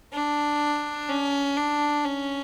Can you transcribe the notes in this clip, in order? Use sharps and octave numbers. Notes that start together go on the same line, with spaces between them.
D4
C#4
D4
C#4